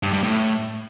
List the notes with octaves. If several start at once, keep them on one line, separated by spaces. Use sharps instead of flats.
G2
G2
A2